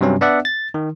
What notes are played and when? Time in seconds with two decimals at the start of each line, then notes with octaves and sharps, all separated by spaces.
0.01 G2 C3 F#3 C#4
0.21 B3 D4 D5 E5 F#5
0.45 A6
0.74 D#3